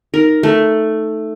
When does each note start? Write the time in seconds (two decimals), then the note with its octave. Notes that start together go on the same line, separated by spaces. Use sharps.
0.14 D#4 A#4
0.43 A3